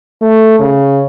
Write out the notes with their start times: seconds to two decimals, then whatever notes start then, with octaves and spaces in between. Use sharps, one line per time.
0.21 A3
0.60 C#3